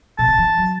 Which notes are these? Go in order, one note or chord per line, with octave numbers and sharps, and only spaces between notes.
B2 A5
D#3
E3
F#3